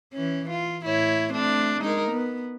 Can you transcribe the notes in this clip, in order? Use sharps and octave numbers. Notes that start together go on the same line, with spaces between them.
E3 C#4
F4
A2 E4 C#5
A3 C4 D4
G#3 D#4 A#4
B3